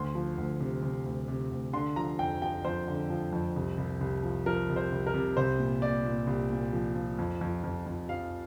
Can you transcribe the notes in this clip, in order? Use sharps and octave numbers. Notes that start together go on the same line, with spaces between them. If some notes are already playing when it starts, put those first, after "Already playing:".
Already playing: D2 C6
F3
D2
C3
C3
D2
C3
D2
D3 C6
F3 A#5
F2 G5
F3 G5
F2 C5
D3
F3
F2
C2
C2
C2
F3
F3 A#4
C2
C5
C2
A#4
C3
C2 C5
A#2
A#2 D5
A#2
C2
A#2
F3
F3
F2
F2
F2
F2
F3 F5